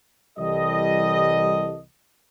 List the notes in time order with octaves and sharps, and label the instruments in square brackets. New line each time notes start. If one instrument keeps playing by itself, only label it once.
[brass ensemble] C2 E3 G3 A4 D#5